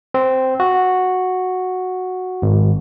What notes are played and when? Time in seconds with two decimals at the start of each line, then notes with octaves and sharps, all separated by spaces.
0.14 C4
0.60 F#4
2.42 G#1